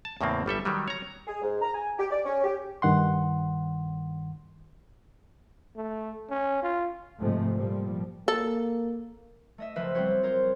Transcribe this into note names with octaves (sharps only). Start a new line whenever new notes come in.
A5
E2 A2 C#3 A#3 C4
G1 G3 A4 E5
D#3 F#3 G3
C#5 A#5
G#4
G#2
A#5
G#5
G4
D5
C#4
G4
G2 D#3 F#5 C6
A3
C#4
F4
G#2 C3 F3 G#3 A3
A#2 F3 G3
A#3 A4
A3 D#5 E5
F#1 F3 B4 C5 E5 B6
G3 B3 C4 F#4 C5 C#5
F4 A#4 C5 C#5